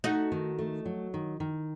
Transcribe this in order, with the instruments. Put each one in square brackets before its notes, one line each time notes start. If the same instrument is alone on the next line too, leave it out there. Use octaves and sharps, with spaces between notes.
[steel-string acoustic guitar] A3 [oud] D#4 F#4
[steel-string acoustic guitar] D#3
A3
F#3
D#3
D#3